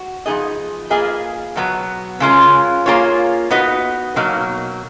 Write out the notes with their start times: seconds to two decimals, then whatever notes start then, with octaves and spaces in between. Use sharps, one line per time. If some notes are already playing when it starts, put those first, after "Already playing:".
Already playing: F#4
0.26 F3 B3 D#4 G#4 D#5
0.90 A#3 F4 G#4 B4 D#5
1.56 B2 F#3 B3
2.20 C#3 G#3 C#4 F4 A#4
2.86 A#3 F4 G#4 C#5
3.51 B3 D#4 F#4 B4 D#5
4.16 B2 F#3 A#3 D#4